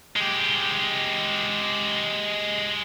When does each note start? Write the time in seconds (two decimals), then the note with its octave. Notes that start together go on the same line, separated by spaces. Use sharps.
0.16 G#3 G4